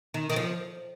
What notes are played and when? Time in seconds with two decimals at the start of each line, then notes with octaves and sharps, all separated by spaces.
0.14 D#3
0.30 D#3
0.36 F3